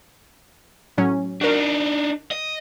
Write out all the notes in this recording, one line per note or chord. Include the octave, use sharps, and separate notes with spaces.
A2 F#3 C#4
D4 D#4 F#4 A#4
D#5